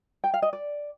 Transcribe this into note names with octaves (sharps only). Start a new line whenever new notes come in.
G5
F5
D#5
D5